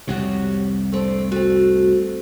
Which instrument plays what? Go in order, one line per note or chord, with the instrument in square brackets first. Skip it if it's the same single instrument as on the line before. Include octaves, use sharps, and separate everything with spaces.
[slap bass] C2 F2 C3 [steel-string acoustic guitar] F#4 G4 C#5
[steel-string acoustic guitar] A3 C4 D4
[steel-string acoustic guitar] A3 C4 [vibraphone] F#4